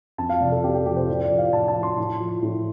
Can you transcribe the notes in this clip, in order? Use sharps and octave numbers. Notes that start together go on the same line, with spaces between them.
F2 A5
F5
C3 F3 D5
A4
F2 G4
G4
C3 F3 G4
C5
A2 D5
D5
F3
F5
A2 A5
A5
F3
C6
A2
F3
A2